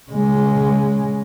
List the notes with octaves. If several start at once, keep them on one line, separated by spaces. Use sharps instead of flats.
C#3 G#3